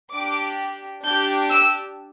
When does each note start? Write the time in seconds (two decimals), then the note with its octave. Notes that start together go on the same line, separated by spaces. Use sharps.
0.13 D4 G4 D6
1.04 D4 G4 G6
1.50 E6